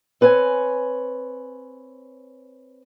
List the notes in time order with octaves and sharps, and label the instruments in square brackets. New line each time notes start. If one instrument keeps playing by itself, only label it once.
[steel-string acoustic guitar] C4 B4 C#5 F#5 G#5